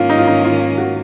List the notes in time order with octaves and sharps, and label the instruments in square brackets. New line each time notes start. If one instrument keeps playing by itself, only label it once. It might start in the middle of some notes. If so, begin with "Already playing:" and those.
Already playing: [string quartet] G#2 D#3 A#3 C#4 [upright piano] F4
[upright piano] D#4
F4
D#4
F4
F#4